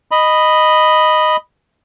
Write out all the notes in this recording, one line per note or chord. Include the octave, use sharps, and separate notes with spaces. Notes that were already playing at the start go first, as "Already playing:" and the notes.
D#5 B5